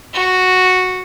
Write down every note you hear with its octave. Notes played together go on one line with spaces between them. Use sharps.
F#4